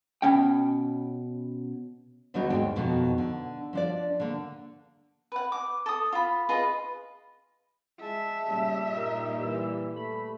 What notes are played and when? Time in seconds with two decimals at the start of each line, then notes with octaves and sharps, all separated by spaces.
0.22 B2 C#4 G5
2.34 D#2 D3 F#3 B3 D#4 F#4
2.50 D#2 G#2 G5
2.76 F2 B2 D#3
3.18 D3
3.73 F3 D4 D5
4.20 D3 A#3
5.32 B4 F#5
5.52 D6
5.86 A4 D#6
6.12 F4 B5
6.49 F4 G#4 B4 D#5
8.01 G#3 E5 A5
8.48 G2 A#2 C#3 G3
8.97 D#4 A#4
9.42 E3 E6
9.95 A3 B5